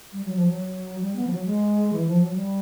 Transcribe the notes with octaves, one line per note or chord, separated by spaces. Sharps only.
G3
F#3
F3
F#3
G3
B3
F3
F#3
G#3
E3
F3
F#3
G3